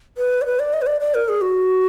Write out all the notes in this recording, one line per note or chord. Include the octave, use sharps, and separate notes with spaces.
B4
D5
B4
D5
D#5
B4
D5
D5
A#4
G#4
F#4